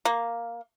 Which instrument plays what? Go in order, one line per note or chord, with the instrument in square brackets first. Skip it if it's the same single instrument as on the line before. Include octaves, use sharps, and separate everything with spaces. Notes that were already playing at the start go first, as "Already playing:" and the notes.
[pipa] A#3